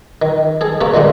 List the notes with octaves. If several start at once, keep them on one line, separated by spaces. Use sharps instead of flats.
D#3
G#4 A4
C3 A#3 A4 C#6
D3 D#3 F3 G#3 A#3